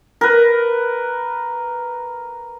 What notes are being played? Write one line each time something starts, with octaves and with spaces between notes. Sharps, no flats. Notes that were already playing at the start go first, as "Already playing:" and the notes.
A#4 B4